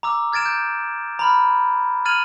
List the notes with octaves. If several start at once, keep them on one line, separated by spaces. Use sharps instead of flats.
A#5 D6 E6
F6 G#6 A6 D7 E7
G6
A#5 B5 F6
F6 G#6 A6 D#7 F7 F#7